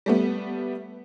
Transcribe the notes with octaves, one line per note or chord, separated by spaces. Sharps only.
G3 A3 B3